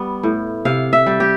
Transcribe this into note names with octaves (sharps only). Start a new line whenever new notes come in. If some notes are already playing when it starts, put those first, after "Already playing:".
Already playing: G3 B3
A2
C3 F5
E5
G3
G4